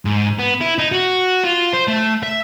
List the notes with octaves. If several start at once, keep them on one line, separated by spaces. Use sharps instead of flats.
G#2
B3
E4
D#4
F#4
F4
C5
A3
E5